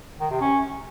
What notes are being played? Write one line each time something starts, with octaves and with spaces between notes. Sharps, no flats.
D#3
C3
C#4